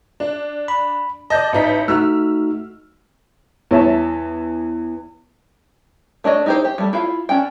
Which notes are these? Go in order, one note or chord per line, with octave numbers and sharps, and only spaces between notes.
D4
B5
D5 D#5 A5 G6
A1 D#4 B6
A3 D#4 F#4 E6 F6
E2 C#5 E5 A5
A3 D4 C#5 D#5
D#4 E4 G4 A#4 C5
G4
G3 A3
E4 F4 F5
C#4 D4 G5